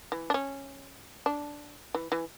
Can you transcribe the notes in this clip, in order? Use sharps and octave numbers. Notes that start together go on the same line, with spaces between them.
E3
D4
C#4
D4
E3
E3